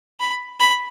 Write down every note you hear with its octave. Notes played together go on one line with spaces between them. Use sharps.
B5
B5